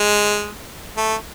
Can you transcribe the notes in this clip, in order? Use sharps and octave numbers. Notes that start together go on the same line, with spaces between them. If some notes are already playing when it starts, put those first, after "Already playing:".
Already playing: G#3
A3